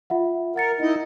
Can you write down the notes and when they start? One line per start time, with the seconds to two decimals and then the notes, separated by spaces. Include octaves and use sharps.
0.10 F4 E5 F#5
0.56 A#4 F#5 A6 C#7
0.81 D#4 E4 D#5